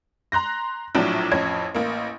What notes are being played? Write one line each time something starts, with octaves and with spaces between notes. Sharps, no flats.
A#5 C6 F#6 A#6
A#1 A2 F3 F#3 D4 D7
A1 F2 C#4 G#6
A1 A#3